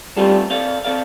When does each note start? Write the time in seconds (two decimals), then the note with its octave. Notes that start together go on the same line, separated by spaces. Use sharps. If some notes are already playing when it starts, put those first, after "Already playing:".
0.17 G3 A3 C4 F4 A4
0.50 C4 A4 D5 F5
0.85 C4 A4 D5 F5